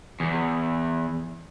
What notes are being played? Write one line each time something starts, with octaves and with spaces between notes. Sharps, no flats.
E2